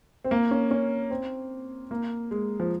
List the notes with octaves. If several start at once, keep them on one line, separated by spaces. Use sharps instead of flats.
C4
A#3
C#4
C#4
C4
A#3
G#3
F3